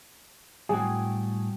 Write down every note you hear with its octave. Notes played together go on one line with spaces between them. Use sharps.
A2 G3 C4 F#4 G#4